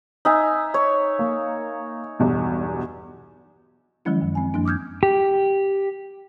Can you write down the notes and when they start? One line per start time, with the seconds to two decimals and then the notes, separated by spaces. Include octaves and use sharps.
0.25 D#4 E5 G#5
0.74 C#5
1.19 A#3
2.19 B1 E2 G2
4.05 D#3 F3 F#3 G#3 C#4 E4
4.21 F#2
4.35 C4 G#5
4.54 F#2 F3 A#3 D4
4.65 D6 D#6 F6 G6 G#6
5.03 G4